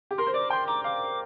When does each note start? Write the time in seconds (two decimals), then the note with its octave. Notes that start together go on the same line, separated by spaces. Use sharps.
0.11 G4
0.18 A#4 C6
0.27 C5
0.34 D5 D6
0.50 G5 C6
0.67 A#5 D6
0.84 F5 D6